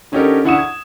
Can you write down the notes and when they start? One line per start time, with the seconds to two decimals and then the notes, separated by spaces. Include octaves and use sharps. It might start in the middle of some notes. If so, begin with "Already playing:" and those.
0.12 D3 C#4 D#4 G4 A4 A#4
0.45 D3 E4 F#5 C#6 D#6 E7
0.58 G#6